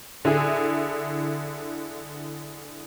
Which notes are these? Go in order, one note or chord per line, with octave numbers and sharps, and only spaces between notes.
D3 E4 G#4